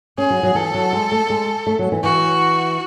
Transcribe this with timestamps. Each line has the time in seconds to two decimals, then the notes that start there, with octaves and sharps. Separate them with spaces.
0.18 C#4 G#4
0.30 F#3
0.43 F#3
0.55 E3 A4
0.74 F#3
0.93 G#3
1.12 A3
1.30 G#3
1.67 A3
1.79 F#3
1.92 E3
2.04 E3 F#4